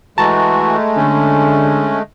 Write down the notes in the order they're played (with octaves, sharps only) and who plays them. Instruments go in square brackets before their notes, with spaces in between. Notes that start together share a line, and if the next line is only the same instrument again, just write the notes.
[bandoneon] E3 F#4 [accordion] G#3 A3 [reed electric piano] A5 A#5
[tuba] D3 [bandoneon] C#4